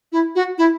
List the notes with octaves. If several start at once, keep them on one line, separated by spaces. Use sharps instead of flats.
E4
F#4
E4